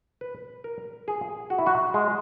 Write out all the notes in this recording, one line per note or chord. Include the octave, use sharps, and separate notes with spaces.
B4
A#4
G#4
F#4
E4
F#4
G#3